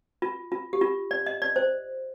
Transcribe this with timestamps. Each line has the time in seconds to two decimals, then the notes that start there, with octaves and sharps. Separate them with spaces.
0.22 F4
0.52 F4
0.73 G4
0.81 F4
1.11 D5
1.26 D#5
1.42 D5
1.56 C5